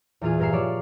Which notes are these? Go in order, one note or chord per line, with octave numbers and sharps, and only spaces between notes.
E2 A#2 E4 F4 G#4 F5
G2 G4 A#4 F5 E6 C7
F3 C#5 D5